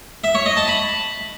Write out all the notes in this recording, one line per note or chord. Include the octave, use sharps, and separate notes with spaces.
E5
C#5
D#5
A5
B5